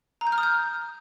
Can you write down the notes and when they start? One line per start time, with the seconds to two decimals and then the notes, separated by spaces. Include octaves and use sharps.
0.21 A#5
0.27 G6
0.32 F6
0.38 D#6
0.43 G6